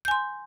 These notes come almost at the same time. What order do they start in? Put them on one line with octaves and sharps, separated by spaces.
G6 G#5 C6